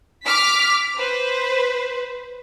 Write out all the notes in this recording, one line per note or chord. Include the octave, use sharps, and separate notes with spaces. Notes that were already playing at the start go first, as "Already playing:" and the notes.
D6 F6 B6
B4 C5